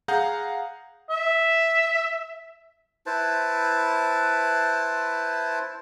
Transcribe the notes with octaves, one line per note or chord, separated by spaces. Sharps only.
G#4 F5 F#5 A#5 G6
E5
E4 B4 C5 A5